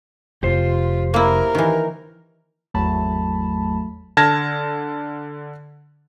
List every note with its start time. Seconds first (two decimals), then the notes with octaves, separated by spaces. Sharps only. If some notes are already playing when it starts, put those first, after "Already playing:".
0.43 F1 F4 G4 C5
1.14 A#3 E4 A#4
1.55 D#3 E3
2.74 G#1 E2 F#3 A3 A5 B5
4.17 D3 A5 F6 G#6 A#6